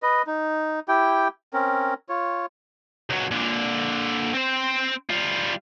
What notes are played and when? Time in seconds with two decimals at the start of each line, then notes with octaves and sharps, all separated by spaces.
0.03 B4 D#5
0.27 D#4
0.88 E4 G4 G5
1.53 C4 C#4 A#4
2.09 F4 C#5
3.10 C#2 F#3
3.31 A#2 D3
4.34 C4 C5
5.10 G3 F4